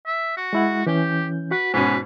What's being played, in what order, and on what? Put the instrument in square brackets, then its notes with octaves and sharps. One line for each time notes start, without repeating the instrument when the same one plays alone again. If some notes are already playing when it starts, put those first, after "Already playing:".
[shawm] E5
F#4
[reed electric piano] G#3 E4 F#5
[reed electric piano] E3 C#4 G6 [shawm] G4
[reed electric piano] F#4 F#5 [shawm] B4
[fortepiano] G#2 B2 C#4 [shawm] B4